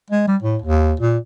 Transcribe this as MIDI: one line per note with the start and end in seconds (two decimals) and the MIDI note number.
0.10 0.24 56
0.28 0.37 55
0.42 0.57 45
0.62 0.94 39
1.00 1.18 46